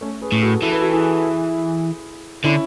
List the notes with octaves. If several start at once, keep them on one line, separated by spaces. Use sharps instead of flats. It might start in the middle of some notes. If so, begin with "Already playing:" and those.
A3 C#4
G#4 B4
A2
F#4 A4
E3 A4
B4
F#4 A4
E4 G#4
D3 C#4 E4